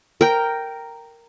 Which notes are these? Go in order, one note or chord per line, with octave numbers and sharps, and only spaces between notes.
A#4 G5